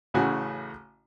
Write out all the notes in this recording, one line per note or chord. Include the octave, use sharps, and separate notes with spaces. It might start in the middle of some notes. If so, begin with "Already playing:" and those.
A1 A2 C#3 C#4 F#4 G#5